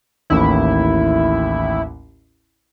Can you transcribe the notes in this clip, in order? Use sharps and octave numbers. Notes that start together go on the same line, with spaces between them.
A1 D#2 E4